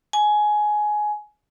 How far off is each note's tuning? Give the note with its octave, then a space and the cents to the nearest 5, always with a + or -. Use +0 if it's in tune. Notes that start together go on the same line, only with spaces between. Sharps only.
G#5 +15